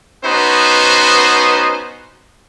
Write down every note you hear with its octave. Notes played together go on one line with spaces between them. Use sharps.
B3 C#4 D#4 F#4 B4 C5